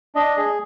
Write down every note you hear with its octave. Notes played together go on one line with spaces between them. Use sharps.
D4 D#5
G#4